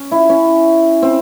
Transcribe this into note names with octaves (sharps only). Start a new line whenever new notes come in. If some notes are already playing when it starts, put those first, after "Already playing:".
Already playing: C#4
E4
C#4
C4